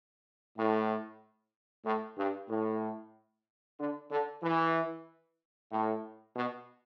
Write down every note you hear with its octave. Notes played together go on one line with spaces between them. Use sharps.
A2
A2
G2
A2
D3
D3
E3
A2
B2